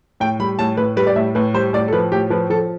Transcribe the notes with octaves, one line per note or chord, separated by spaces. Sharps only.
A2 G5
G3 B5
A2 A5
A2 B4
G3 B4
D5
A2 E5
A2 B4
G3 C5
A2 D5
A4
F3 B4
A2 G4
F3 B4
F3 A4